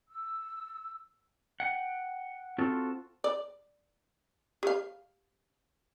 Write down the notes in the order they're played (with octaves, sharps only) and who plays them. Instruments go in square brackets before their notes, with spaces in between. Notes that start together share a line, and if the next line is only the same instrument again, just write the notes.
[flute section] E6
[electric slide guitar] F#5 G5
C4 F4 F#4 A4
[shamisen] D5
G4 F5